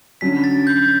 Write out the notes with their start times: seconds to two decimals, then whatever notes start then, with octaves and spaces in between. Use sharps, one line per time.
0.21 D3 F#3 C#4 B6
0.44 A6
0.67 G6